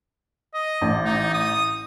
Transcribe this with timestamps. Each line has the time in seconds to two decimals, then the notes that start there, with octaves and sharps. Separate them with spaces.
0.54 D#5
0.81 A1
1.05 D#4
1.34 D#6